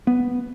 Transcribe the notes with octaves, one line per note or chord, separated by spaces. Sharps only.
B3